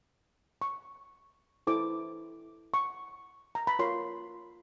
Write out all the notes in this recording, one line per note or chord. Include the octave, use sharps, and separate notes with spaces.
C#6
E4 A4 C5 D6
C#6
A#5
B5
F4 A#4 C#5 C6